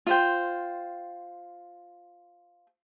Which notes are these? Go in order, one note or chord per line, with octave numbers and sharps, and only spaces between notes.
F4 C5 G5